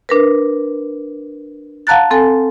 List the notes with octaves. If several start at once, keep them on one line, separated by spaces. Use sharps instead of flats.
D4 A#4 B4
F5 F#5 A5 A#5 F#6 A6
C4 A4 G#5